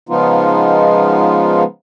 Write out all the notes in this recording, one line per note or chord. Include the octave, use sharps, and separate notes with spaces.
C#3 F3 G#3 B3 D#4 F4